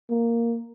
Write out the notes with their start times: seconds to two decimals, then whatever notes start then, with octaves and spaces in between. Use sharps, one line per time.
0.10 A#3